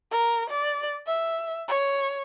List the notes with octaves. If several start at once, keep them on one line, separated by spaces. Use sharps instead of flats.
A#4
D5
E5
C#5